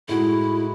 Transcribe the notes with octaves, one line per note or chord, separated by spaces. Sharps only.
A2 G#3 D#4 E4 F#4